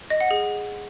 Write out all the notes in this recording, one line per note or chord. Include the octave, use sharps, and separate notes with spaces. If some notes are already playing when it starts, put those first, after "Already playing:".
D#5
F#5
G#4